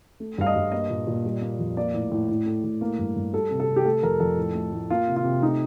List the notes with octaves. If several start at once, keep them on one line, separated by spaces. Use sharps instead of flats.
A3
G2 F5
D#5
G2
A#3 D#5
A#2
A#2
G3
A#3
F2
A#3 D5
A2
A2
A2
A3
A2
A#3
G2
G2
G3 A4
C3
A4
C3
G4
A3 A4
F2 A#4
F2 A4
A2
A3
A2
A#3 F4
C3
F4
C3
A3 D#4